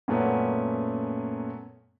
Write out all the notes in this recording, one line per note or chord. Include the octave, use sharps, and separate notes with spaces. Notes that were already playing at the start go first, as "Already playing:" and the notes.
F#2 A#2 A3 B3 C#4